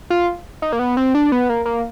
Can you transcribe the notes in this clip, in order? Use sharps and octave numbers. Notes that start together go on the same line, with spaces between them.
F4
D#4
A#3
B3
C4
D4
B3
A#3
A#3